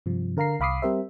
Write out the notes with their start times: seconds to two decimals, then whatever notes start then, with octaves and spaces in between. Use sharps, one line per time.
0.06 G2 C3 F3
0.37 D3 A#4 F5 A#5 C7
0.60 C2 F5 B5 D6 D#6 C7
0.82 G3 C4 G4 A#4 C5 E5